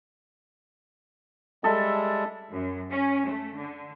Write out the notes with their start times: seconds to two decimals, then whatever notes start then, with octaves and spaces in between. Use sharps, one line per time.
1.64 G3 G#3 A4 E5
2.52 F#2
2.91 C#4
3.26 A3
3.56 D3